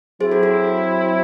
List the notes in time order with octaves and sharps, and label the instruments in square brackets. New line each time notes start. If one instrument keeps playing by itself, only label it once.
[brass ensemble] F#3 C4 E4 [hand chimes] G#4 C5
[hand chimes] F#4 A4
F#4 A4